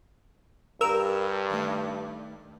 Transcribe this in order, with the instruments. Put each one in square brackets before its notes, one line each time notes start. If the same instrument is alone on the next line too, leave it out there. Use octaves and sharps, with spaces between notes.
[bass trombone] G2 [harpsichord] F4 G4 [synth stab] A#4 E6
[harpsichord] D#3 A3